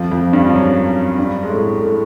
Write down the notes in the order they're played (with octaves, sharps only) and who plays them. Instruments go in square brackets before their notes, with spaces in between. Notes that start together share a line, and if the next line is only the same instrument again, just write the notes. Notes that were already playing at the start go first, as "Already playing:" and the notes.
Already playing: [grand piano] F2 F3
F2 F3
G2 G3
F3
F#2 F#3
G2 G3
G#3
A2 A3
A2 A3